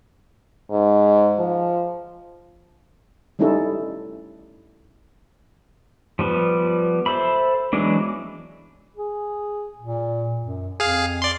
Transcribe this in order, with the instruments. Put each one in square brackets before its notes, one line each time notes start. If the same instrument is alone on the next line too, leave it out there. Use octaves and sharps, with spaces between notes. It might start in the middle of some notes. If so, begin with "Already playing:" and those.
[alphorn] G#2
F3
[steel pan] G3 A3 C#4 D#4 E4 A4
[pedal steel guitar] F3 G3 B3
A4 C5 E5 B5
E3 F#3 G#3 B3 D4
[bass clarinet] G#4
A#2
F#2
[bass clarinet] F2 [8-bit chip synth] G#4 F5
[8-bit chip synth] D5 C6